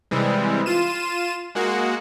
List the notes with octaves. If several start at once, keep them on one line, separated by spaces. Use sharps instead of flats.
C3 E3 G3 G#3
F4 D#7 E7
G#3 A#3 F#4